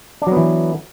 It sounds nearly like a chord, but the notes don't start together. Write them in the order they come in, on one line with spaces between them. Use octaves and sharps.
D4 F#3 B3 E3